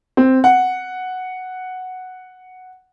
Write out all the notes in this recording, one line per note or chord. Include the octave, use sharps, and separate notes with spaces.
C4
F#5